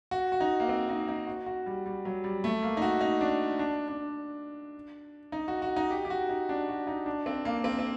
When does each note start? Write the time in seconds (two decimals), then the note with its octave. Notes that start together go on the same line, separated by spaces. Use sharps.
0.11 F#4
0.32 F#4
0.40 D#4
0.60 A#3
0.69 C4
0.89 D#4
1.08 D#4
1.27 F#4
1.46 F#4
1.66 G3
1.86 G3
2.05 F#3
2.24 G3
2.44 A3
2.63 A#3
2.77 D#4
2.82 F#4
3.01 D#4
3.21 D4
3.59 D4
3.88 D4
5.32 D#4
5.48 F#4
5.62 F#4
5.76 D#4
5.90 G4
6.05 G4
6.10 F#4
6.29 D#4
6.49 D4
6.68 F#4
6.87 D#4
7.06 D4
7.26 C4
7.45 A#3
7.64 C4
7.79 C4